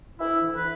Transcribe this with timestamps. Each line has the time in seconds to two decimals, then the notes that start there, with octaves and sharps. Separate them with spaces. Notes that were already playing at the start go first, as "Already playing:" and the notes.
0.19 D2 E4
0.42 E3
0.54 B4